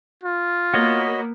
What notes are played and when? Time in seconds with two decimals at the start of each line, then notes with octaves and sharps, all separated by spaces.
0.24 F4
0.74 A#3 B3 F#4 C#5 D#5